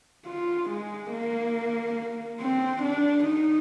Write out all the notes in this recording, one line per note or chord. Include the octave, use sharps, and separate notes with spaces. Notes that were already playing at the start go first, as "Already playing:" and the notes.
F4
G#3
A#3
C4
D4
D#4